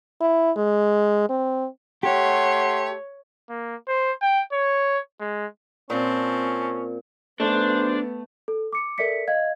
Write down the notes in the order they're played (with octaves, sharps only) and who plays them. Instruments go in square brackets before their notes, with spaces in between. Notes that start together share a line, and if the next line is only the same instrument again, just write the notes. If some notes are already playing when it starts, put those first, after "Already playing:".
[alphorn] E4
G#3
C4
[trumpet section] A3 C6 [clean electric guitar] G4 [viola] C#5 [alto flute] F#5
[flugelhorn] A#3
C5
G5
C#5
G#3
[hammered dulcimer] A#2 [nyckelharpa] C4 A5 [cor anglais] C#4
[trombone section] B1 F#2 C5 [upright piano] A3 [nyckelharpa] B3 [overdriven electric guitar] D4
[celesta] A4
D6 C#7
A4 A#4 D5 E5 B6 C#7
D#5 F5 G#6